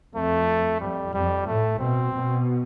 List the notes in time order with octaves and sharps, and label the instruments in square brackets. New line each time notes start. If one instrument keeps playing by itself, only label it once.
[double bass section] F2 [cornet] A3
[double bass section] F2 [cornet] G3
[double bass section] F2 [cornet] G3
[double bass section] A2 [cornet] A3
[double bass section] B2 [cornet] C4
[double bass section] B2